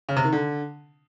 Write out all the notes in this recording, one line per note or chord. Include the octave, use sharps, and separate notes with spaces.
C#3
C3
D#3
D3